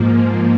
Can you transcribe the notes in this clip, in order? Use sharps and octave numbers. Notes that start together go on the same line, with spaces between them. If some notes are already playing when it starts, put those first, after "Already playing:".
Already playing: G#2 F3 A#3